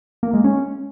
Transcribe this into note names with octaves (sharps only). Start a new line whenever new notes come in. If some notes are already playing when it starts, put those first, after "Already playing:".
A#3
G#3
C#4